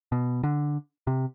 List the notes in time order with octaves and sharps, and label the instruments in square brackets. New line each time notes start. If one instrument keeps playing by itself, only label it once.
[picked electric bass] B2
D3
C3